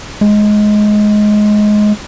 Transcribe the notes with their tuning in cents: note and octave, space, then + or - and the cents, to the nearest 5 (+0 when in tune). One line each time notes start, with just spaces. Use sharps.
G#3 +15